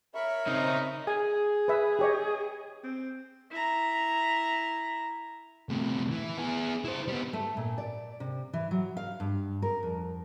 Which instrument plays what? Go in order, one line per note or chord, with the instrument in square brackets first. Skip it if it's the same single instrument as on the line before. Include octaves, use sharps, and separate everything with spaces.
[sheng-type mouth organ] A#4 B5 C#6 [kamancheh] C#5 E5
[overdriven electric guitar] C#3 C4 [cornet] D#4
[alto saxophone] G#4 [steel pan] G#5
[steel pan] B4 E5
G4 C#5 D#5
[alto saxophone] C4
[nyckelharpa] E4 A#5
[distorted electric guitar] A2 C3
E3
B3 G#4
E4 C5
G3 B3
[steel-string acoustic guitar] A3
A#2
D5
C3
E3
F#3
F5
G2
A#4
F2